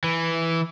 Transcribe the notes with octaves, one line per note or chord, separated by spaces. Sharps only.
E3